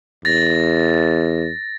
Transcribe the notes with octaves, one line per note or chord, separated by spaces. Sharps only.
E2 A6 A#6